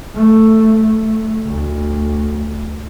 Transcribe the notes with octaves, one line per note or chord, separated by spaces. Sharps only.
A3
A3
D2